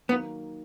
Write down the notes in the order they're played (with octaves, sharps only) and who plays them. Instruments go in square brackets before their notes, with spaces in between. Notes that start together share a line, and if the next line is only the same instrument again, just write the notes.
[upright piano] D#3 F#3 A#3 [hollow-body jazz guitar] B3